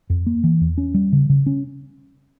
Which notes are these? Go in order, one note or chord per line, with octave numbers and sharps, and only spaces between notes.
F2
A#3
E3
E2
C#4
G3
C#3
C#3
C#4